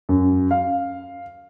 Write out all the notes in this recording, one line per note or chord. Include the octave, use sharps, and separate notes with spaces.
F#2
F5